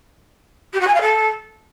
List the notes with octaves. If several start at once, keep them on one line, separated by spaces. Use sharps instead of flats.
G4
F#4
G#5
F5
A4